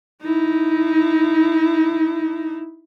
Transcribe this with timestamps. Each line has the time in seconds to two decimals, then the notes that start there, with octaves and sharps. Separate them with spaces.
0.22 D#4 E4